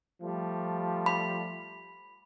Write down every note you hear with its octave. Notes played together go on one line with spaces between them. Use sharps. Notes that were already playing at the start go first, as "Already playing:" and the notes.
F3 G3 A3
B5